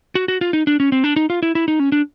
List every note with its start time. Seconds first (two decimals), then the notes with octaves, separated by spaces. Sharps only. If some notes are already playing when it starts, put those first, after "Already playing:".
0.15 F#4
0.28 F#4
0.41 F4
0.53 D#4
0.67 D4
0.80 C#4
0.92 C4
1.04 D4
1.16 D#4
1.30 F4
1.43 E4
1.55 E4
1.68 D#4
1.80 C#4
1.92 D4